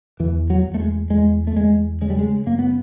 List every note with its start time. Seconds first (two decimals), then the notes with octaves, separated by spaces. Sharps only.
0.20 E2 E3
0.50 F#3
0.65 E2
0.74 A3
0.80 G#3
1.10 E2 G#3
1.47 A3
1.56 E2 G#3
2.01 C#3 G#3
2.10 G3
2.19 G#3
2.46 F#2 A#3
2.59 B3